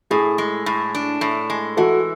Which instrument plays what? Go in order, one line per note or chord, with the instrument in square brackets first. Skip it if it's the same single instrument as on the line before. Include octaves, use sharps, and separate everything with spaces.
[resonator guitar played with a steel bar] A2 [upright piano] E4 G#4
[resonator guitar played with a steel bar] G#3
A2
D4
A2
G#3
[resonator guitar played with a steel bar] E3 [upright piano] F#4 A4